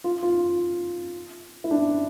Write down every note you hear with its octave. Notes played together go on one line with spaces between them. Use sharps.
F4
F4
E4
D4